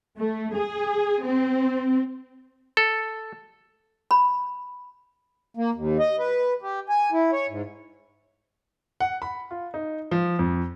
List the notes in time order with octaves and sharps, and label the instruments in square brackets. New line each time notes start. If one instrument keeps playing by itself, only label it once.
[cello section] A3
G#4
C4
[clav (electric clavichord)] A4
[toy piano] B5
[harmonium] A#3
D#2
D#5
B4
G4
G#5
E4
C#5
G#2
[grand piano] F#5
B5
F4
D#4
F3
F2